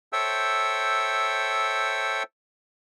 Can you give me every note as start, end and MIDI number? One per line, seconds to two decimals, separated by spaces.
0.13 2.23 69
0.13 2.23 72
0.13 2.23 73
0.13 2.23 76
0.13 2.23 79
0.13 2.23 88